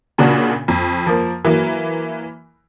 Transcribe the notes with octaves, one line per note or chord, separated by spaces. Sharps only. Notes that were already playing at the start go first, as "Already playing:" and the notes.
A#2 C#3 D4 F#4
F2
F3 A#3
E3 F#3 A#3